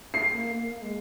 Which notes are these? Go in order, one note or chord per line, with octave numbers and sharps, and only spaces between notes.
A3 C7
A3
A#3
A#3
G#3